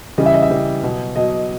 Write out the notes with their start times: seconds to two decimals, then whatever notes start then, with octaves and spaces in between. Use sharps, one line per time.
0.18 C#3 E3 G3 D#5
0.26 E5
0.34 D#5
0.42 E5
0.50 C#3 E3 G3
0.83 B2 F#3
1.16 B2 F#3 D#5